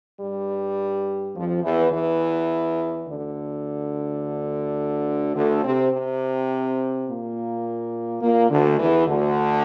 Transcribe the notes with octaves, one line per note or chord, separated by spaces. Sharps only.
G2 G3
F2 F3
E2 E3
E2 E3
D2 D3
D2 D3
C3 C4
C3 C4
A#2 A#3
A#2 A#3
D2 D3
E2 E3
D2 D3